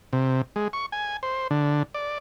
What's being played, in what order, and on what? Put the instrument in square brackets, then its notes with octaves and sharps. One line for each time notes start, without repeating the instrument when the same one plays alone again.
[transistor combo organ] C3
G#3
C#6
G#5
C5
D3
D5